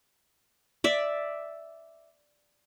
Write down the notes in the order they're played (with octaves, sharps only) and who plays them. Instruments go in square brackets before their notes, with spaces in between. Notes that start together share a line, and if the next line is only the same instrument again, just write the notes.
[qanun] D5 E5